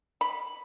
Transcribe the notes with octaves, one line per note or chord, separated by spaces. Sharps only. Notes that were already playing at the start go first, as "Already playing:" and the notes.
B5